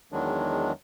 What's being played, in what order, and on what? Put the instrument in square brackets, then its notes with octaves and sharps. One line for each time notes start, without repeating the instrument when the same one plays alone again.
[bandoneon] E2 D#3 F#3 G#3 D4